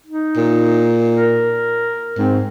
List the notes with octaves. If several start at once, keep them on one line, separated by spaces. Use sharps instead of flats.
D#4
A#2
A#4
G#2 C4